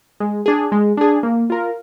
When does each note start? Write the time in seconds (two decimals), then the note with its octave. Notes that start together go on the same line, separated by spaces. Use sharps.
0.20 G#3
0.46 D4 G#4
0.72 G#3
0.97 D4 G#4
1.23 A#3
1.50 F4 A#4